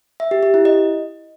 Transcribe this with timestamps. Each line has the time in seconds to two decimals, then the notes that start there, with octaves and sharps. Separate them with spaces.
0.20 E5
0.31 G4
0.43 G4
0.54 E4
0.65 D#5